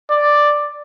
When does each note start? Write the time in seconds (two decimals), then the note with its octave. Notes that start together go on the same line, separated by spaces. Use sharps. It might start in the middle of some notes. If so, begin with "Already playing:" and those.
0.11 D5